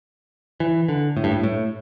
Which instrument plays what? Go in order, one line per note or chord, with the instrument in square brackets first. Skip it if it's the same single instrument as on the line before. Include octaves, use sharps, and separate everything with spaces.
[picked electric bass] E3
D3
A2
G2
A2
A2